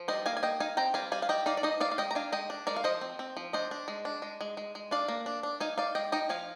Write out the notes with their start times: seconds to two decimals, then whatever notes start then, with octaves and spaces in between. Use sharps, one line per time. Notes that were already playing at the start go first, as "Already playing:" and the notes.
Already playing: F3
0.08 G3 C5 D#5
0.26 A#3 F5 G#5
0.37 G#5
0.43 A#3 D#5 G5
0.60 D#4 F5 G#5
0.77 C4 G5 A#5
0.94 G3 F5 G#5
1.12 G3 F5 G#5
1.22 F5
1.29 G3 D#5 G5
1.46 D#4 D5 F5
1.57 D5
1.63 D#4 C5 D#5
1.80 D#4 D5 F5
1.92 F5
1.98 G#3 D#5 G5
2.11 A#5
2.15 D4 F5 G#5
2.32 G#3 D#5 G5
2.50 D4
2.67 G#3 A#4 D5
2.76 F5
2.84 F3 C5 D#5
3.01 C4
3.19 C4
3.37 F3
3.53 D4 C5 D#5
3.71 D4
3.88 G#3
4.05 D4
4.22 G#3
4.41 G#3
4.57 G#3
4.75 G#3
4.91 D4 D5 F5
5.08 A#3
5.26 D4
5.43 D4
5.60 D#4 F5 G#5
5.77 D#4 D5 F5
5.95 G#3 D#5 G5
6.12 D#4 D#5 G5
6.29 F3 F5 G#5